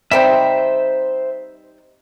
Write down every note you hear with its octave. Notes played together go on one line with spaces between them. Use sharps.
G3 C4 D#4 C5 E5